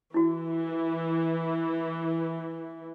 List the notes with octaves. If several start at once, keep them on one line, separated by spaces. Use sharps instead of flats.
E3 E4 F#4